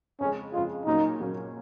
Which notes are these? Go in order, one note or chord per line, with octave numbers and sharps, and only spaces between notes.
F2 C#3 G#3 C#4
F2 C#3 G#3 F4
A#2 F#3 A#3 C#4 D#4
A#2 F#3 A#3 C#4